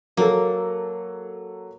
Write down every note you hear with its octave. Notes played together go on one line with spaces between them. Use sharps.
F#3 A#3 A4